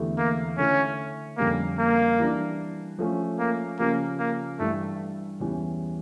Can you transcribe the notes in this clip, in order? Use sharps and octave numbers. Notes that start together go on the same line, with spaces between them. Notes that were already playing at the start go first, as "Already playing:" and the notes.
Already playing: E2 D3 A3 E4 G4
A#3
D3 A3 C#4 E4
F2 D3 G3 A#3 C#4
A#3
E3 G3 D4
F3 A3 C#4
A#3
C#3 F3 A#3 C#4 G4
A#3
G2 E3 G3 A3
E2 E3 G3 C#4 G4